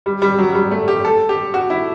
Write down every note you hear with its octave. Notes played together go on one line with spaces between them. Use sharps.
G3
G3
F#3
F#3
G3
A3
G4
A4
G4
F#4
E4